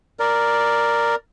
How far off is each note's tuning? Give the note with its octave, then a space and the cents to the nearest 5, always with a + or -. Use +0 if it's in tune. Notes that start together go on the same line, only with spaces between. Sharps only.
A#4 +0 D5 +0